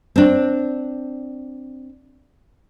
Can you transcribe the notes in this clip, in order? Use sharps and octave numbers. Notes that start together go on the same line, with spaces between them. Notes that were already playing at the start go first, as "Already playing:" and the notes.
C4 D4